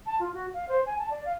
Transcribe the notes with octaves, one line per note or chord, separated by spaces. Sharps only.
A5
F4
F#4
F5
C5
G#5
A5
D5
F5